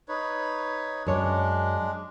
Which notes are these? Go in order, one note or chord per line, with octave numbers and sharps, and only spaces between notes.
D#4 B4 C#5
F#2 G#3 D4 C#5